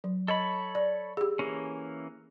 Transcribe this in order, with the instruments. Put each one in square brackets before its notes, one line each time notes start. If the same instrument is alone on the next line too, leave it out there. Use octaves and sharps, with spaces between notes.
[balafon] F#3
[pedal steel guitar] A4 C#5 B5 [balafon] D#5
[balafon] D5
G4 G#4
[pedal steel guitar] E3 A#3 C#4